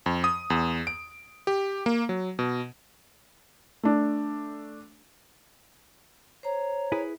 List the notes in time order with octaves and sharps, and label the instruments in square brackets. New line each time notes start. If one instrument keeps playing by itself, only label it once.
[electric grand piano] F2
D#6
E2
D7
G4
A#3
F#3
B2
[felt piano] A3 D4
[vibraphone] C5 A#5 [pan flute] C#5
[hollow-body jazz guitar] E4 G#4 B4